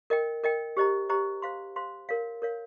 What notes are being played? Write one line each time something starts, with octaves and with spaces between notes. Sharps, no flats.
A#4 D#5 G5
A#4 D#5 G5
G4 C5 D#5 A#5
G4 C5 D#5 A#5
C5 F5 C6
C5 F5 C6
A#4 C#5 F5
A#4 C#5 F5